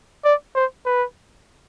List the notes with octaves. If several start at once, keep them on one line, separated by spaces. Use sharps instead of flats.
D5
C5
B4